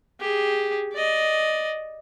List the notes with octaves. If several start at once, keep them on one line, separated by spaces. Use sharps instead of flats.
G4 G#4
D5 D#5